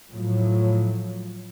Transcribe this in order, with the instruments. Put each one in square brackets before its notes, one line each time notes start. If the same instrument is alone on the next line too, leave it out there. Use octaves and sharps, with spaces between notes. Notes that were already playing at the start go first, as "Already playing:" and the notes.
[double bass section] A2 F3 F#3